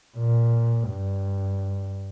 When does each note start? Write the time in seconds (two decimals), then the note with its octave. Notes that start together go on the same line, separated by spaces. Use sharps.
0.17 A#2
0.90 G2